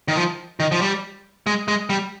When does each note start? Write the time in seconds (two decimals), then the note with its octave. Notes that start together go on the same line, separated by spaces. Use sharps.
0.08 D#3
0.16 F3
0.60 D#3
0.72 F3
0.81 G3
1.47 G#3
1.68 G#3
1.90 G3